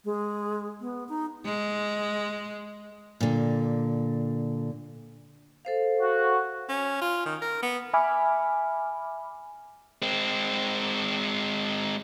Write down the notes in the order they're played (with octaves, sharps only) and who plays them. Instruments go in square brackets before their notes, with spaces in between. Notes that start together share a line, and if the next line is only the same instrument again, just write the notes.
[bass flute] G#3
B3
D#4
[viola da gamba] G#3
[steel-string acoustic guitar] A#2 D3
[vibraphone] A4 C5 F5
[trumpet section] F#4
[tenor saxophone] C#4
F4
D#3
A#4
B3
[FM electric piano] E5 G#5 B5 D6 F6
[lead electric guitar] G#3 C4